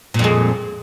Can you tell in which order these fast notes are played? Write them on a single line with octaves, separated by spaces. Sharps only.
A#2 F2 G#3